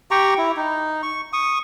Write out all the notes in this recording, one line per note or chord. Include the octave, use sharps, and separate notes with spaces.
G4 G5 A#5 C#6
E4
D#4
C#6
C#6 D#6